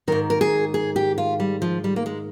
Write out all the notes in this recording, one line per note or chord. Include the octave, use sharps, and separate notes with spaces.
G#2 D#3 A#4
A#4
G#4
G#4
G4
F4
G3
F3
G3
A#3
G#3